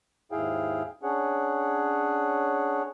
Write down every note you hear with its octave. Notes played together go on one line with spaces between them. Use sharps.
D#2 G#2 E4 G#4 F5 G5
C#4 D4 G#4 C#5 F#5